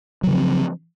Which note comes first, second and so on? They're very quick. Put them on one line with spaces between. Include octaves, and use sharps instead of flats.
F#3 C#3 F3 C4